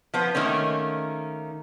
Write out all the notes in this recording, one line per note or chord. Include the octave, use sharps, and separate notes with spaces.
F3 B3 C5
D#3 A3 A#3 C#4